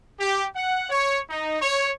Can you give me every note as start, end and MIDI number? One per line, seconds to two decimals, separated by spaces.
0.20 0.45 67
0.56 0.86 78
0.89 1.20 73
1.30 1.59 63
1.62 1.91 73